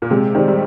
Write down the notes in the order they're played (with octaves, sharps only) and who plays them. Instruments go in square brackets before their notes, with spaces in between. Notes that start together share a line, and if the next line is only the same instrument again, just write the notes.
[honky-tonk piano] A#2
[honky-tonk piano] C3 [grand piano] G#3
[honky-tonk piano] D#3 [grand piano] C4 G4 D5
[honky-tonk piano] G3